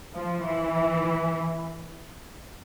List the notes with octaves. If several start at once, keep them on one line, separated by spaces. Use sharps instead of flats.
F3
E3